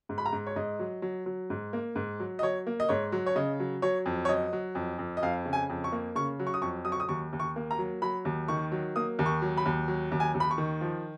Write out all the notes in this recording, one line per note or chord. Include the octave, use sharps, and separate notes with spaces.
G#2
B5
A#5
G#2
C#5
G#2 D#5
F#3
F#3
F#3
G#2
A#3
G#2
F#3
D#5
F#3 C#5
A#3
D#5
G#2 C#5
F#3
C#5
C#3 D#5
F#3
F#3 C#5
F2
C#5
F#3 D#5
F#3
F2
F2
D#5
F2 F5
C#3
G#5
F2
C#6
A#3
C#3 C#6
F#3
C#6
D#6
F2 C#6
F#3 D#6
C#6
D#6
D#2 C#6
D#2
C#6
A#3
A#5
F#3
F#3 B5
D#2
D#3 C#6
F#3
A#3 D#6
D#2
C#6
F#3
B5
D#2
F#3
D#2
G#5
D#2
B5
C#6
D#3
F3